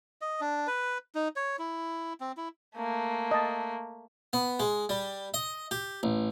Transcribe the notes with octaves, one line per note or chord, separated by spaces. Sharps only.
D#5
D4
B4
D#4
C#5
E4
C4
E4
A3 A#3
D#5 A5
B3
G#3
G3
D#5
G4
A1